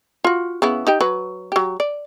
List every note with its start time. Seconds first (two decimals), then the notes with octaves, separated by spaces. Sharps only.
0.24 F4 F#4
0.62 C#3 B3 E4
0.87 D#4 G4 G5
1.01 F#3 B4
1.52 F#3 G4
1.80 D5